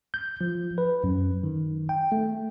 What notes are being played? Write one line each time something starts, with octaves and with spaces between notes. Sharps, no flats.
G6
F3
B4
F#2
D#3
G5
A3